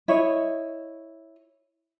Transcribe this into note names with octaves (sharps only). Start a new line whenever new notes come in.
E4 C#5 D#5